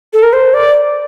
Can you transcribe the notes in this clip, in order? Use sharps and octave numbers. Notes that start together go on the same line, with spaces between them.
A4
A#4
C5
D5